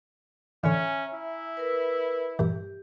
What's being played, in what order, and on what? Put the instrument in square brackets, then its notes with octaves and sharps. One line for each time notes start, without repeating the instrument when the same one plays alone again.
[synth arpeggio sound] A2 D3 E3 [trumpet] C#4 [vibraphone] E5 G#5 A#5
[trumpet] E4
[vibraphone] A#4 B4
[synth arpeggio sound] G2 A#2 E3 [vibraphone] G4